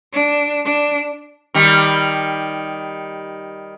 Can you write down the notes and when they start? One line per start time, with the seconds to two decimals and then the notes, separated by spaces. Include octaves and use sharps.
0.13 D4
0.65 D4
1.54 D#3 G3